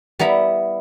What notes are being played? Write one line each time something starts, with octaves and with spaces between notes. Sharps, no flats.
G3 B3 E4 A#5